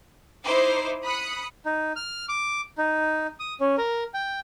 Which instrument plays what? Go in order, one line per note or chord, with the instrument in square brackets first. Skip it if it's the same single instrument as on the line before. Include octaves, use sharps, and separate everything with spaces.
[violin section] D#4 E4 C5 D6
B5 D#6 F#6 C#7
[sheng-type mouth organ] D#4
F6
D6
D#4
D#6
C#4
A#4
G5